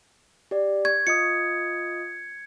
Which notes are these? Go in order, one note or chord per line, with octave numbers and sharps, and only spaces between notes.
G4 D5
C#6 G#6
F4 D#5 D#6 C#7